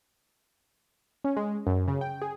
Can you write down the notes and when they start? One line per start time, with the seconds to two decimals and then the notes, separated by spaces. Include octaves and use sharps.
1.24 C#4
1.37 G#3
1.67 F#2
1.88 C#3
2.01 G5
2.22 G#4